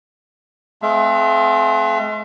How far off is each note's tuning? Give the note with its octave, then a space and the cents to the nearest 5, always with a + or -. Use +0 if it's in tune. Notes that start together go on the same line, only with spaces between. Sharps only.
G#3 +45 C4 -25 E5 +45